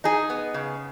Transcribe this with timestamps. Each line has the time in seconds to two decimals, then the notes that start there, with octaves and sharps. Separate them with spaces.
0.04 D#4 G#4
0.30 B3
0.54 C#3